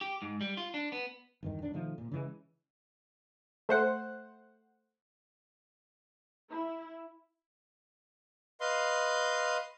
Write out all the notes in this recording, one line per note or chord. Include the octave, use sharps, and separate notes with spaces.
G4
G#2
G3
F4
D4
B3
G1 E2 D#3
E1 D4
B2 D#3 F3 A3
A#2
C#3 E3 G#3
A3 C5 F#5
E4
B4 D#5 F5 C6